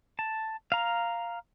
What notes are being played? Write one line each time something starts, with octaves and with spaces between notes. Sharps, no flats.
A5
F5 A#5